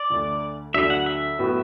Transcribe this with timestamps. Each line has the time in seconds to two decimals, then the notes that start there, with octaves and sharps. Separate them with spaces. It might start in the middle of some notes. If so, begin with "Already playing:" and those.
Already playing: D5
0.10 D2 D3 A3
0.74 D2 D3 F#3 D4 F#4 E5
0.90 F#5
1.06 E5
1.39 A2 F#3 B3 F#4